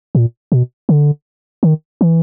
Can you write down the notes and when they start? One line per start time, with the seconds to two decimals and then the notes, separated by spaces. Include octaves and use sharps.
0.15 A#2
0.52 B2
0.89 D3
1.63 D#3
2.01 E3